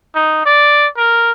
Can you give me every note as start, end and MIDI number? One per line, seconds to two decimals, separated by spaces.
0.15 0.41 63
0.46 0.87 74
0.97 1.32 70